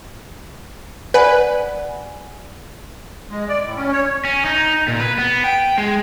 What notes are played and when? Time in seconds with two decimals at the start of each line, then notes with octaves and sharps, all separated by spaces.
1.14 B4 D5 F#5 G#5
3.30 G#3
3.49 D5
3.64 A2
3.76 C#4
3.92 C#5
4.25 C#4
4.45 D#4
4.88 A#2
5.00 B4
5.19 B3
5.44 G5
5.78 G#3